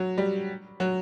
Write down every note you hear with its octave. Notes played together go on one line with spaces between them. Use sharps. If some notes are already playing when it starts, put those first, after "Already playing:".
Already playing: F#3
G3
F#3